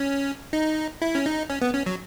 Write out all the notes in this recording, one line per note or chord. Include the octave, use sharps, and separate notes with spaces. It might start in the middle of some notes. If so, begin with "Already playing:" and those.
Already playing: C#4
D#4
E4
C#4
D#4
C#4
B3
C#4
F#3